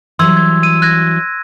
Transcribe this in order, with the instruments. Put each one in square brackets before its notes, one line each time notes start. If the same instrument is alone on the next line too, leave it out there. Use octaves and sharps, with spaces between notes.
[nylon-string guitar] E3 F#3 G3 [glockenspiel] C6 E6 G#6
[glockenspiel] G#6
E6 D#7
F#6 G#6 A#6